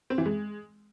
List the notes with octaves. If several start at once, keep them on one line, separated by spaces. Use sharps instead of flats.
C4
E3
G#3